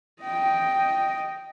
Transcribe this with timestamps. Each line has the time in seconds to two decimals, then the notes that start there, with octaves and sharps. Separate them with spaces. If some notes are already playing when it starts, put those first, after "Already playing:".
0.22 D#5 G5